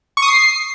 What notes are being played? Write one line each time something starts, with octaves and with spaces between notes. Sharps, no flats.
C#6
D#6
C7